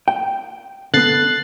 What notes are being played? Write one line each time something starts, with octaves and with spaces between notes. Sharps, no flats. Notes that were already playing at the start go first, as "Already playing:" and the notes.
G5
D3 B3 F#6 A6 C7